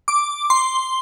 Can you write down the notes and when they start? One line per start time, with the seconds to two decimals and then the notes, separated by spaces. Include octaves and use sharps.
0.08 D6
0.50 C6